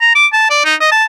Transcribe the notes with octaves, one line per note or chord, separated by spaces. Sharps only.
A#5
D6
A5
D5
D#4
D#5
A5